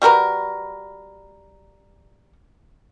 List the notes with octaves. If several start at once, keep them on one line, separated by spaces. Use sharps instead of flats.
G3 F#4 A#4 B4